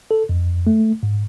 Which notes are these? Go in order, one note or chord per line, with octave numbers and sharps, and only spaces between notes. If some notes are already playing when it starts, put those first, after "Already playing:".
A4
F2
A3
G#2